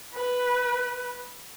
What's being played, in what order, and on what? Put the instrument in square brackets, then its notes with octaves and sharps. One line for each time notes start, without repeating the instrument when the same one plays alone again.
[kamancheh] B4